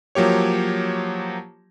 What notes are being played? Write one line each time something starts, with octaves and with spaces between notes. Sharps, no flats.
F3 F#3 A#3 G4 C#5